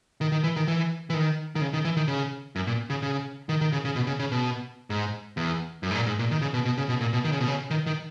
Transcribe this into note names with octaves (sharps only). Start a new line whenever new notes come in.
D#3
D#3
E3
D#3
E3
E3
D#3
D#3
C#3
D#3
E3
D#3
C#3
F#2
A#2
C#3
C#3
D#3
D#3
C#3
C#3
B2
C#3
C#3
B2
G#2
E2
F#2
G#2
A#2
G#2
A#2
D#3
C#3
B2
B2
C#3
B2
A#2
B2
D#3
C#3
B2
C#3
D#3
D#3